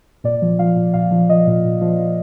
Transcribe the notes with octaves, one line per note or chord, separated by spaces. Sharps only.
A#2 D5
F3
F3 F5
A#2
A#2 F5
F3
F3 D#5
A#2
A#2
F3
F3